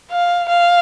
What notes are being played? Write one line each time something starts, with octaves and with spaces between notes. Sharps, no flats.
F5
F5